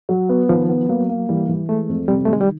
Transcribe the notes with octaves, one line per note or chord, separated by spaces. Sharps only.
F#3
B3
D#3 F3
B3
F#3 A#3
A#3
E3 G3
E3
G#3 A3
F2
C3 G3
D#3 A3
G#3
G3